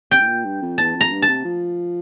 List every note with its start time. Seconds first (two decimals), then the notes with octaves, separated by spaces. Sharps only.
0.11 C3 G5
0.20 A2
0.28 A#2
0.45 G2
0.62 F2
0.78 E2 A5
0.95 F2
1.01 A#5
1.12 G2
1.22 A5
1.28 C3
1.45 F3